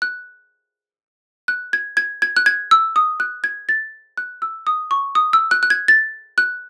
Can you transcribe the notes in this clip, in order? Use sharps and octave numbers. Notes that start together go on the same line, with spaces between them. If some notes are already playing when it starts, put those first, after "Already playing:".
F#6
F#6
G#6
G#6
G#6
F#6
G#6
E6
D#6
F#6
G#6
A6
F#6
E6
D#6
C#6
D#6
E6
F#6
F#6
G#6
A6
F#6